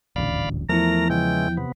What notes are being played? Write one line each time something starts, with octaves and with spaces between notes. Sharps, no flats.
D#1 A1 D2 D5 F5 B5
E2 F3 A3 E4 A#4 A#5
C#3 E3 G#3 G5
C3 B3